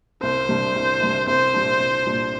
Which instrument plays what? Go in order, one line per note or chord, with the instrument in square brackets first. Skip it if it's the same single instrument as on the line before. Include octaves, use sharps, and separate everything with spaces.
[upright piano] C2 [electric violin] C5
[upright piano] C3 G3 D4
C2
C3 G3 D4
[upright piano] C2 [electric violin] C5
[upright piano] A#2 G3 D4
C2
A#2 G3 D4